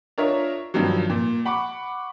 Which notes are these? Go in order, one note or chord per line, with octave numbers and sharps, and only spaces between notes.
D4 F4 A#4 C#5 D#5 E5
G2 D#3 F3 F#3
A#2
F#5 B5 C#6 D6